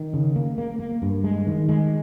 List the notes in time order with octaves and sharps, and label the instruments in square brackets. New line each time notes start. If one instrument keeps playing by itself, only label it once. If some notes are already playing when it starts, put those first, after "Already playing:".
Already playing: [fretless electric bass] D#3
C#3
A#3
A#3
A#3
G2
G#3
D#3
G#3